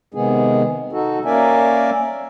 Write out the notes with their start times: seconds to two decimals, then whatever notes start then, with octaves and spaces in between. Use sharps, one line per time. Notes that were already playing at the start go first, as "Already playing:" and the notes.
0.14 C3 D#3 G#3 B3 G#4
0.92 D#4 F#4 A4
1.25 A#3 C#4 A#4 D5 E5 G#5